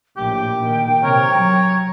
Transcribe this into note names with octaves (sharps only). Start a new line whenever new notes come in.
A#1 A2 G4 G5
A#2 D#3
C3 A#4 C#5
F#3 A#5